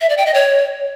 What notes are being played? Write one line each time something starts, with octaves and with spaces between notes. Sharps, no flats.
E5
D5
G5
D#5
C#5